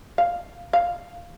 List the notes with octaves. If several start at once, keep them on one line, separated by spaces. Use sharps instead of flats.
F5
F5